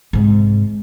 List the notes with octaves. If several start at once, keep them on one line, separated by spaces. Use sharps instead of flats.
G#2 C3